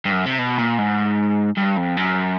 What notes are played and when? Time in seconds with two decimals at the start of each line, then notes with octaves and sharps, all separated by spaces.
0.05 G2
0.12 F#2
0.26 C3
0.39 B2
0.58 A#2
0.78 G#2
1.57 G2
1.77 F2
1.97 F#2